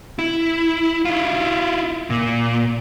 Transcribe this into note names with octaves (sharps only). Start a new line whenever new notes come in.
E4
E4 F4
A#2